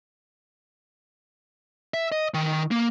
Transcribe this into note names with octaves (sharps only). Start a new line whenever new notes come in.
E5
D#5
D#3
A#3